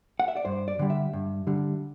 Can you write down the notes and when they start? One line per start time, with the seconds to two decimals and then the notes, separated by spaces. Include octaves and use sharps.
0.20 F#5
0.28 E5
0.36 D5
0.45 G2 C5
0.68 D5
0.79 D3 G3
0.90 E5
1.13 G2
1.47 D3 G3